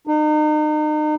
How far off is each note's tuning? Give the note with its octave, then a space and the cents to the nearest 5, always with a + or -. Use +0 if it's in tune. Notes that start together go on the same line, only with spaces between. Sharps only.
D#4 -35